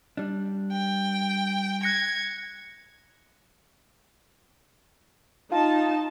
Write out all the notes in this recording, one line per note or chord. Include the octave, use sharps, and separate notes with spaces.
G3 D4
G5
F#6 G#6 A#6 C#7
D#4 F4 A5